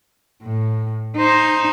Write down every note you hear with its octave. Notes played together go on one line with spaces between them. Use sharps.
A2
D#4 C5